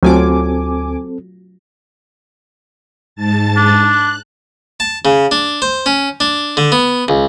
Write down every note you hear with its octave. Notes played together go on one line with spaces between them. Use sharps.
D2 F#3 A3 C4 F4 A4 G#5 D6
G#2 A5 A6
D4
F#6
A5
C#3
D4
C5
C#4
D4
D3
B3
C#2